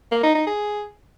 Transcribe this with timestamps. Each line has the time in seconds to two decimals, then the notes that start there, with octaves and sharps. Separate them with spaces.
0.11 A#3
0.23 D#4
0.35 D#4
0.46 G#4